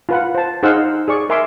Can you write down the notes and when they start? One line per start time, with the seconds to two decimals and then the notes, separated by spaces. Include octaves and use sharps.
0.09 F4 B4 F#5
0.35 C5 A5
0.63 D#4 G#4 C5 F5 F#5 E6
1.08 G#4 D5 C#6
1.29 A#4 E5 G#5 C6 D6